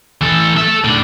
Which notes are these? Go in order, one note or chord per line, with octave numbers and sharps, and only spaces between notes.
E3 A4
A4 E5
A2 D4